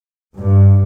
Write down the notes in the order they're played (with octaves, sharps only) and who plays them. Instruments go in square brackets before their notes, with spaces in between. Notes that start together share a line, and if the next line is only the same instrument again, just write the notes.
[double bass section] G2